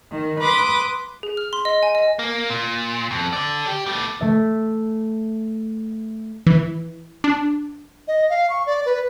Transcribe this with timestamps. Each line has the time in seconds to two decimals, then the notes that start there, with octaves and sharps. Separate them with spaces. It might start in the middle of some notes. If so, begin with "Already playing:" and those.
0.11 D#3
0.40 B4 C6 D6 D#6
1.23 G#4
1.37 F6
1.53 C6
1.65 D#5
1.83 G#5
1.95 D#5
2.19 A#3
2.50 A#2
3.11 F2
3.33 A4 D5
3.67 G4
3.86 G3 A3
4.20 A3 E5 A6
6.47 E3
7.24 D4
8.08 D#5
8.30 F5
8.50 C#6
8.66 D5
8.86 B4